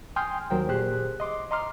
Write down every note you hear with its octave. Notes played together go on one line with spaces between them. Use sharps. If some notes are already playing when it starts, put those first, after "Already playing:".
G5 G#5 C6 D#6 F6 G6
D#2 F#3 A#4 C5 G5
A#2 G4 G#4 C5 F#6
D#5 C6 D6
D#5 A#5 C6 D6 F6